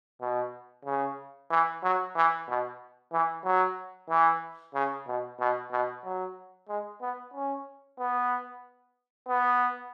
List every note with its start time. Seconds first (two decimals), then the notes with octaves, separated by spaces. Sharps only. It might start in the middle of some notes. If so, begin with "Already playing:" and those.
0.21 B2
0.85 C#3
1.51 E3
1.83 F#3
2.16 E3
2.48 B2
3.12 E3
3.45 F#3
4.10 E3
4.75 C#3
5.07 B2
5.40 B2
5.72 B2
6.05 F#3
6.69 G#3
7.02 B3
7.34 C#4
7.99 B3
9.29 B3